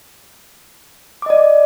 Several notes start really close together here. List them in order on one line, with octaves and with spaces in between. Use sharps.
D6 D#5 D5